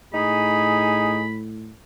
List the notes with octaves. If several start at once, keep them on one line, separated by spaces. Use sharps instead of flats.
A2 D#4 G#4 B5